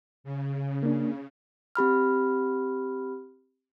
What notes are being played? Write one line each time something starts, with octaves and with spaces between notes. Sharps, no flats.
C#3
A#3 D4
C4 G4 B5 F6